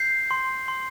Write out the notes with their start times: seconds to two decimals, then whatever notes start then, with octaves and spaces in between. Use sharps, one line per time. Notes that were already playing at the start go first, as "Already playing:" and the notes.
Already playing: G6 C7
0.31 C6
0.68 C6